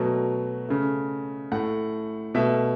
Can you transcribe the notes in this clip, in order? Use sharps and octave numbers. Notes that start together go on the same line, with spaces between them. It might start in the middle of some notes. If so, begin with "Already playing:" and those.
Already playing: B2 F#3 A3
C#3 A3
A2 A3 F#5
B2 A3 E5